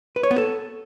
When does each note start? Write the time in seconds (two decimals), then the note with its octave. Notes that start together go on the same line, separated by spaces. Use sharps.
0.16 B4
0.23 C#5
0.31 B3
0.38 A4